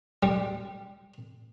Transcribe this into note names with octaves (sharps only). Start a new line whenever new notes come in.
G3